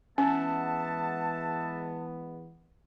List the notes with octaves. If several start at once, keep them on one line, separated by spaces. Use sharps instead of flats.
E3 G#3 B3 C#4 E5 F#5 A5